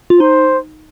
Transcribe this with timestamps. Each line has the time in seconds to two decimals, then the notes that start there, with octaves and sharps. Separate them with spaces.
0.10 F4
0.20 D#4 C5